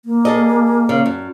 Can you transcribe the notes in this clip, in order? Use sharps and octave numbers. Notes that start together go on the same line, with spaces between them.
A#3
G#4 A4 D#5
C#3
F#2